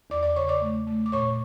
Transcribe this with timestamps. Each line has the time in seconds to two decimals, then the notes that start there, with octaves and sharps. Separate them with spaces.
0.10 E2 D5 D6
0.23 D5 D6
0.36 C#3 C#5 C#6
0.48 D5 D6
0.61 A3
0.87 A3
1.06 D6
1.12 A#2 C#5 C#6